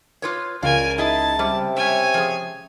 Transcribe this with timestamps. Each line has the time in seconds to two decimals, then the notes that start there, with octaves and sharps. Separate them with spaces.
0.22 F4 B4 C#5 C6 D6 D#6
0.62 C#2 F4 A#4 D5 F5 G#5
0.98 D#4 E4 G#4 E5 A5
1.39 C3 G3 E5 D6
1.76 G3 C#5 E5 G#5 F6 G#6 D#7
2.14 F3 G#4